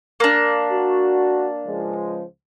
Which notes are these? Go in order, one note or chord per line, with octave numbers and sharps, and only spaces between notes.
A#3 D4
F#4
C#2 F3 G#3